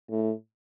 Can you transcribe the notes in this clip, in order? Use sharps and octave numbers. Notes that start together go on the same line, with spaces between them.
A2